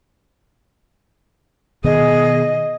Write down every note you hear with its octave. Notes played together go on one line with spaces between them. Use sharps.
B2 D#3 B3 G#4 D#5